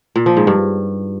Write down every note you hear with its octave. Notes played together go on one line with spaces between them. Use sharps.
A#2
F3
G#2
G2